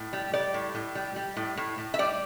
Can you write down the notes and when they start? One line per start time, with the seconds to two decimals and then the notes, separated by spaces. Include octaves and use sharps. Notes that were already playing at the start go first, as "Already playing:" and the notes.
Already playing: A2
0.13 G3
0.33 G3 D5
0.54 A2
0.75 A2
0.95 G3
1.16 G3
1.37 A2
1.57 A2
1.78 A2
1.94 E5
1.99 G3 D5